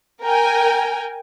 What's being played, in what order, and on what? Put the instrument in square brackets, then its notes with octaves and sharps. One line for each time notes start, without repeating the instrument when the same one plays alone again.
[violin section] A#4 G5 G#5